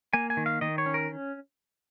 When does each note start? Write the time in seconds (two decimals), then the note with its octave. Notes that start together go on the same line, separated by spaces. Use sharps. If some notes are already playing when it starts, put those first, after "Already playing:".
0.14 A#3 G#5
0.30 G#5
0.37 D#3
0.46 F5
0.61 D#3 D#5
0.78 C#5
0.86 C#4
0.94 A#4